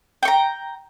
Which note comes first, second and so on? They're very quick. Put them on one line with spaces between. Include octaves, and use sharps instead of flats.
G5 C#6 A#5